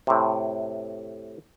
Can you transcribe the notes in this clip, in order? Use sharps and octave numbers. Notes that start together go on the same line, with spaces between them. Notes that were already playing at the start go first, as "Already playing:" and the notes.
A2 C3